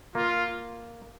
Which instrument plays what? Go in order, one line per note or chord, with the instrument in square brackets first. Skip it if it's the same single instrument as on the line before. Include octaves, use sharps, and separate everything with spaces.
[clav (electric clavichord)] A#3 [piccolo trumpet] F4